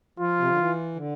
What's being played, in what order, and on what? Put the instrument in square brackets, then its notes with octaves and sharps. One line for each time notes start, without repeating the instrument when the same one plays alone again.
[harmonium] F3 [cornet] F4
[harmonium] C3
D3
E3
D3